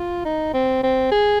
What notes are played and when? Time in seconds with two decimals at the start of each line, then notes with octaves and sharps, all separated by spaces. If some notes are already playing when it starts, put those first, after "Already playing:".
Already playing: F4
0.25 D#4
0.54 C4
0.83 C4
1.11 G#4